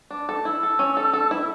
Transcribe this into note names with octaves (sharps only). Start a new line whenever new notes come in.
D4
A4
E4 E6
A4
C#4
A4
A4
E4